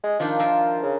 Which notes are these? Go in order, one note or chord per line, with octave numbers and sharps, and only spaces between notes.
G#3
D#3 F3 D4 F4
F4 A#4 E5
C#3